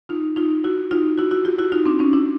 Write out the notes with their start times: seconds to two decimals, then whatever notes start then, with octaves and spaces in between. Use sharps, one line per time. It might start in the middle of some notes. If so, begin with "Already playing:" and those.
0.09 D#4 F4
0.36 D#4 F4
0.64 E4 F#4
0.91 D#4 F4
1.18 E4 F#4
1.31 E4 F#4
1.45 F4 G4
1.59 E4 F#4
1.72 D#4 F4
1.85 C4 D4
1.99 C#4 D#4
2.13 D4 E4